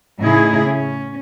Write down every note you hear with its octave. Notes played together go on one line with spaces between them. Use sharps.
A2 C#3 D#4 E4 G#4
C#4